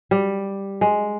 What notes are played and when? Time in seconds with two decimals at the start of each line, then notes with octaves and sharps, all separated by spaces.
0.11 G3
0.81 G#3